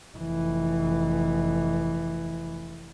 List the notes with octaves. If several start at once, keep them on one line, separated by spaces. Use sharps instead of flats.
F1 E3